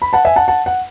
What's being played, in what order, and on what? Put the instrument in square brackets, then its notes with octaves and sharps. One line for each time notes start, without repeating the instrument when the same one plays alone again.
[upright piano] B5
F#5 A5
E5 G#5
F#5 A5
F#5 A5
F#5